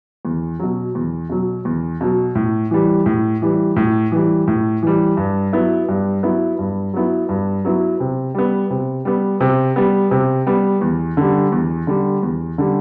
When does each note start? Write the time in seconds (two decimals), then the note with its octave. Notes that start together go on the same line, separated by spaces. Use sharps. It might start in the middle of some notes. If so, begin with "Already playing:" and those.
0.25 E2
0.59 B2 F#3
0.95 E2
1.30 B2 F#3
1.65 E2
2.01 B2 F#3
2.35 A2
2.71 E3 G3
3.06 A2
3.42 E3 G3
3.76 A2
4.12 E3 G3
4.47 A2
4.83 E3 G3
5.17 G2
5.53 F#3 B3 E4
5.89 G2
6.23 F#3 B3 E4
6.59 G2
6.94 F#3 B3 E4
7.29 G2
7.65 F#3 B3 E4
8.00 C3
8.35 G3 B3
8.70 C3
9.05 G3 B3
9.41 C3
9.76 G3 B3
10.11 C3
10.47 G3 B3
10.81 E2
11.17 D3 G3
11.52 E2
11.87 D3 G3
12.23 E2
12.58 D3 G3